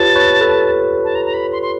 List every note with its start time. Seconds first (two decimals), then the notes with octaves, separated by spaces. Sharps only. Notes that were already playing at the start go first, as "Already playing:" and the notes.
Already playing: F4 G4 B4 C#5 A5
0.16 B4 C#5
0.41 A4 B4
1.04 A5
1.15 A#5
1.25 A#5
1.34 B5
1.52 C6
1.62 C6